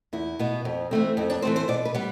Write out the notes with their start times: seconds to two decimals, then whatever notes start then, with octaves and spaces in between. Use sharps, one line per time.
0.13 E2 E4
0.39 B2 B3
0.65 F2
0.91 E3 A3 C4
1.17 F2 C4
1.30 D4
1.42 E3 A3 C4 C5
1.56 C5
1.68 B2 D5
1.85 B4
1.94 G3 B3